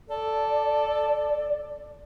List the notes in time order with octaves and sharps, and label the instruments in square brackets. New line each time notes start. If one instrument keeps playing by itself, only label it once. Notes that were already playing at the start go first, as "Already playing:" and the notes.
[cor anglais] A4 [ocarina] D5